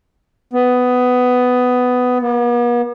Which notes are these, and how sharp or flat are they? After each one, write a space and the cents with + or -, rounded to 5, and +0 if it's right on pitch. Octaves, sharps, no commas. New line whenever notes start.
B3 +15
B3 -45